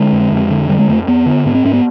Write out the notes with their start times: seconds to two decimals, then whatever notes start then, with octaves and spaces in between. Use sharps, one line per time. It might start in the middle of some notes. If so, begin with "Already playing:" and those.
Already playing: D3 G#3
0.13 F2
0.31 F2
0.50 D3
0.69 D3 G3
0.79 G#3
0.88 F2 A3
1.07 F2 B3
1.26 D3
1.46 G#2 B3
1.54 C4
1.65 G#2 C#4
1.73 B3